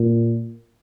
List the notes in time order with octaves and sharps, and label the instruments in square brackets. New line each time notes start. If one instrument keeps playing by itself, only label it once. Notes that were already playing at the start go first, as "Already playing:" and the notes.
Already playing: [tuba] A#2